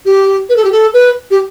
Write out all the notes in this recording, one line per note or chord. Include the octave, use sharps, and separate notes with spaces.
G4
B4
A4
G4
A4
B4
G4